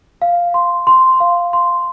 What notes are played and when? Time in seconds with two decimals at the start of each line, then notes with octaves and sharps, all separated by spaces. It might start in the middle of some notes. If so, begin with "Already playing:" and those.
0.22 F5
0.54 C6
0.87 C6
1.20 F5
1.53 C6